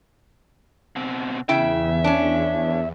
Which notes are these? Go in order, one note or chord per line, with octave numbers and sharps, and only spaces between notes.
B2 C4
E2 C#3 E4 E5 G5
C#4 D4